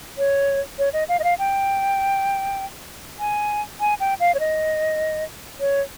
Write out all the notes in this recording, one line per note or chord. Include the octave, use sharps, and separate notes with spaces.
C#5
C#5
D#5
F5
D#5
F5
G5
G#5
G#5
G5
F5
C#5
D#5
C#5